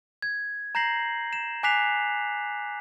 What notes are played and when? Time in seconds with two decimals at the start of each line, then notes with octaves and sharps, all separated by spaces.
0.22 G#6
0.75 A#5 G6 A#6 C7 F#7
1.33 E7
1.63 G#5 D6 F#6 B6 C7 F7